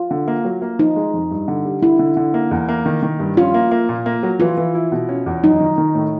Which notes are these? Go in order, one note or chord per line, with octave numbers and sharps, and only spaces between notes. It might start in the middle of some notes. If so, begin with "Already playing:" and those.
Already playing: F4
D3
A#3
F#3
A#3
F3 D#4
G#3
F2
G2
D3
G3
D3 E4
D3
D3
A#3
E2
A#3
D#3
D#3
G2
C#4 F4
A#3
A#3
A#2
A#3
F#3
E3 F4
E3
E4
B2
C#4
E2
F#2 D#4
D#3
D#3
A2